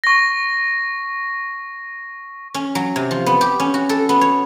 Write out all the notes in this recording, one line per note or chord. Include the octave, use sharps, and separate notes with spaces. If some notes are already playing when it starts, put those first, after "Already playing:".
C#6 A#6
C#4
F#3
C3
F3
B3
G4
C#4
F#4
A4
B3
C#5